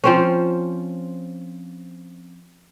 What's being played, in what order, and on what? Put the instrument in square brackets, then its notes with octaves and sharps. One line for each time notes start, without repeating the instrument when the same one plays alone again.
[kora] F3 C4 C#4